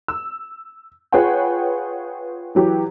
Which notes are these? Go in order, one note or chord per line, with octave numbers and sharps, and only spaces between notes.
E6
F4 G#4 B4 C#5 F#5 G5
E3 F#3 G4